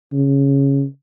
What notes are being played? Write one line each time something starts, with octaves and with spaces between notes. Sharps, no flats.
C#3